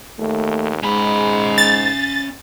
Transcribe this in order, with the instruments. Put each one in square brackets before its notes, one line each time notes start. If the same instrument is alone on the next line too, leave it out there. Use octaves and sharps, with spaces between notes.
[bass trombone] D#2 [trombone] A3
[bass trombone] G#2 [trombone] G#3 [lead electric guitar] C#4 B5
[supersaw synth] A6